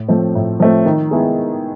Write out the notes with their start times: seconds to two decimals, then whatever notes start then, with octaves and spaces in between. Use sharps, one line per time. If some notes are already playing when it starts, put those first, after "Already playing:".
Already playing: A2
0.08 F3 A3 C4
0.35 A2
0.60 F3 A3 C4
0.85 D#3
1.11 G#3 B3 E4 G#4